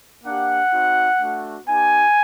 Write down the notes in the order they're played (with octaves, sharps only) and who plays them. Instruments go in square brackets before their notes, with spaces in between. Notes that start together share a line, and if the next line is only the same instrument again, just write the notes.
[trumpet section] A#3 D4 G4 F#5
C4 D#4 F#4
A3 D4 F#4
B3 D#4 G4 G#5